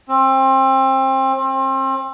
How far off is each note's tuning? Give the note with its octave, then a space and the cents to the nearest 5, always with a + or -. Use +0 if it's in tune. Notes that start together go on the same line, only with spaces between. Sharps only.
C4 +30
C4 +35